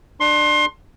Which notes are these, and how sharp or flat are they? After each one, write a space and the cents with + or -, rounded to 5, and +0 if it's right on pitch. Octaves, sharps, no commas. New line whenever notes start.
D4 +25 C6 +25